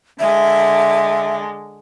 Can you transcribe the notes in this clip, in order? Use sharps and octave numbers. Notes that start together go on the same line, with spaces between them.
D3 G#3 E5